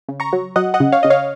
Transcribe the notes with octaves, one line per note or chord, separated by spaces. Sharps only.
C#3
A#5 C#6
F#3
F#3 D#5 F#5
D#5 F#5
C#3
C#5 F5
C#3 D#5
C#5 F5